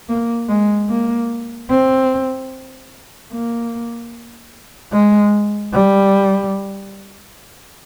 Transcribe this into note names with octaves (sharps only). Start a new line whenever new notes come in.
A#3
G#3
A#3
C4
A#3
G#3
G3